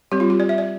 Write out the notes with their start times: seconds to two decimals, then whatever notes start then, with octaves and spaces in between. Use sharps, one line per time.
0.12 G3 C4 G4
0.20 F4
0.30 G4
0.40 D5
0.49 E5
0.58 D5